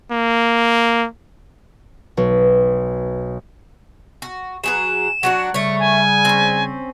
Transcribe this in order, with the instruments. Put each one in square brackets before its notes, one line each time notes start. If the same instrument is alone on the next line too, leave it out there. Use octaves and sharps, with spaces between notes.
[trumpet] A#3
[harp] B1
[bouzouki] F#4
[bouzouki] F#3 G#4 B4 [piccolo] E7
[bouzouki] F#3 D4 F#4 [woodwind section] F#5
[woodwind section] C#3 G3 [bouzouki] A3 C#5 [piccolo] C#6
[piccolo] G#5
[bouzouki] C4 C#4